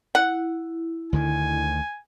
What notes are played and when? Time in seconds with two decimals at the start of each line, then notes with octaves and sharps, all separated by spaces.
0.15 E4 F#5
1.13 D2 D3 D#3 G#5